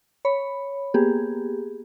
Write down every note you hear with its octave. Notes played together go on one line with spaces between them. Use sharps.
C#5 B5
A#3 B3 G4 G#4